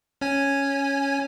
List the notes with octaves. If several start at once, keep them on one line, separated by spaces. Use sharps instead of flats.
C#4 G#5